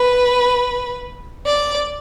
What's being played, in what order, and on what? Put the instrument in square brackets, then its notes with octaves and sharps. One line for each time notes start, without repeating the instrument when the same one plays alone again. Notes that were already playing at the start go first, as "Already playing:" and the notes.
Already playing: [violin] B4
D5